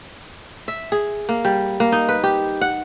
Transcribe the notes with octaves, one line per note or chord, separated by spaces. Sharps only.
E5
G#4
A#3
G3
A#3
D#4
B4
G4
F#5